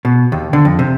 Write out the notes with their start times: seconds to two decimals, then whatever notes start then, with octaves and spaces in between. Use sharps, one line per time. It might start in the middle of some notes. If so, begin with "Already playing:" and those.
0.05 B2
0.32 D#2
0.53 D3
0.65 F2
0.79 C3